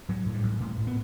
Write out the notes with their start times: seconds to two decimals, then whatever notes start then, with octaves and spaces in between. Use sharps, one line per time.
0.09 A2 F#3
0.26 A2
0.34 G3
0.43 A1
0.60 A2
0.77 A2
0.87 B3